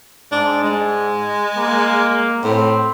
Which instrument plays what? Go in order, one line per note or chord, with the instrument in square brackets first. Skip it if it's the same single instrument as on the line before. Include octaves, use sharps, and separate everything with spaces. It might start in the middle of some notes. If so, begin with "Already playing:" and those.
[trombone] G#2 [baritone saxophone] D4
[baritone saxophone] G#3
[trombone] A#3
[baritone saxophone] A2 [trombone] C4